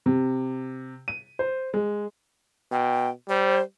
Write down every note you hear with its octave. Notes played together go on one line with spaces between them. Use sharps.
C3
D#7
C5
G#3
B2 G5
G3 C5